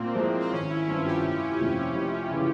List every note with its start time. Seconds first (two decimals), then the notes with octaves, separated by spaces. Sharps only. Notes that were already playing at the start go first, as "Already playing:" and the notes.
Already playing: A#2 A#3 C4
0.16 F3 G#3 E4 A#4
0.40 C4
0.52 G#1 C#4
0.69 E4
0.88 G2 F3 C4 F4
1.00 F4
1.06 G4
1.23 F1 F4
1.59 F2 C3 F3 A#3
1.95 F1
2.31 C#3 E3